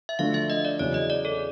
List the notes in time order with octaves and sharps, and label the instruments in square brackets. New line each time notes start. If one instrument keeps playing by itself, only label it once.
[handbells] E5
[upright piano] D3 F3 A3 D4 [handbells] F5
[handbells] E5
D#5
D5
[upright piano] E2 C#3 F#3 [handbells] C#5
[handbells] D#5
D5
A4